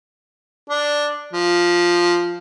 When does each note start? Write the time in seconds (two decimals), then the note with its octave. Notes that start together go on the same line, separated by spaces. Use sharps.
0.70 D4
1.33 F3